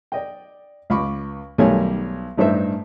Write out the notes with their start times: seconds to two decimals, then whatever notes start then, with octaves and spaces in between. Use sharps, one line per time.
0.12 D5 D#5 G5
0.90 C#2 B5 C#6 D6
1.58 B1 D#3 G3 A3 C#5 G#5
2.37 A1 G2 D4 D#4 C5 E5